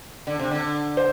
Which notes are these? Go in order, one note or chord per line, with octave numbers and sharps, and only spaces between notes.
D3
C3
D3
C5